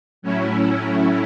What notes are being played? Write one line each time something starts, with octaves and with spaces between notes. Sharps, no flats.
A2 F#3 A3 C#4 E4